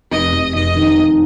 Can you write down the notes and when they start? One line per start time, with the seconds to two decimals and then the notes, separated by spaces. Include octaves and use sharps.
0.12 F1 D#5
0.33 F1
0.55 F1 D#5
0.76 D#3
0.99 F1